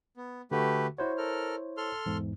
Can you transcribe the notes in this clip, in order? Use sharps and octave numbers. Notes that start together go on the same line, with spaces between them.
B3
D3 A3 F#4 G4 B4
E4 F#4 C5 C#5
A4 A#4 F6
A4 C6 F6
E2 G#2